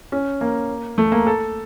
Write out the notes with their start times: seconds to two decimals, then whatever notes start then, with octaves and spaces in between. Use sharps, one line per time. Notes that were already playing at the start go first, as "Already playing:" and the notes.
0.12 C#4
0.41 A#3
0.98 A3
1.12 A#3
1.27 A4